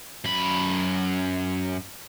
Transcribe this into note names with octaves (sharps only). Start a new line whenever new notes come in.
F#2 B5